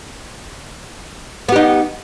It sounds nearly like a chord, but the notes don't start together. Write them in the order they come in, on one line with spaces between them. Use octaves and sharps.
B3 G4 D#4